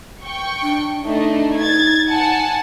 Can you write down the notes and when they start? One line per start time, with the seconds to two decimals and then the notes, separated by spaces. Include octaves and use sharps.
0.23 G5 C#6
0.62 D4
1.03 A3 D4 D#4 D#5
1.58 G#6 A6
2.10 F#5 G#5 A5